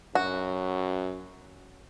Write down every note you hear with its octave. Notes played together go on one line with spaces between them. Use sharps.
F#2 F#4